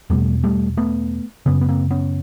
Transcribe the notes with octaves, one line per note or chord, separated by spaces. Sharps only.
E2 B2 G3 A3
G3 A3
A3 B3
F#2 C#3 B3 C#4
B3
A#3 C4
B3 C#4